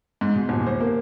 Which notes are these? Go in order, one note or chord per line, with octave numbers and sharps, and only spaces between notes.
G#2
B2
D#1
C5
A#3